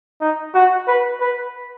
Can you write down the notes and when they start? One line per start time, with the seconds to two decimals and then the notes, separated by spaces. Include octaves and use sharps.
0.21 D#4
0.54 F#4
0.88 B4
1.20 B4